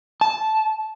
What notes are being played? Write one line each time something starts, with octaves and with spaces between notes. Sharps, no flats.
A5